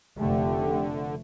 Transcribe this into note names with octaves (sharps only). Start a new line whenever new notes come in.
F1 F2 D3 A3 G4